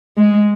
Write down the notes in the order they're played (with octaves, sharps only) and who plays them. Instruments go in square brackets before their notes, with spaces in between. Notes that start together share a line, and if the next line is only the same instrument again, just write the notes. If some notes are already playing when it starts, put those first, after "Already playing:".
[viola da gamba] G#3